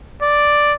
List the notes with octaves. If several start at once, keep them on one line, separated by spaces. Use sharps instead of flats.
D5